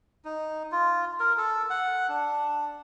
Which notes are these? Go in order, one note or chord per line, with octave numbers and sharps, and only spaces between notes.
D#4
F4
A#4
A4
F#5
D4